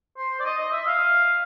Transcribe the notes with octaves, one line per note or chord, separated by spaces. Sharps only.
C5
D5
D#5
D#5
E5
F5